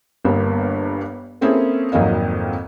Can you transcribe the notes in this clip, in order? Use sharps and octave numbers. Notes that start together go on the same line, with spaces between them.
G1 G2 G3 A#3 B3
A#3 C4 C#4 E4 G#4 A4
G#1 F2 F#3 A#3 D#5 F5